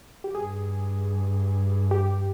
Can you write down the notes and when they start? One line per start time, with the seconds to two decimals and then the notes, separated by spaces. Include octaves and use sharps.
0.24 G4
0.35 G2 G#4
1.91 G4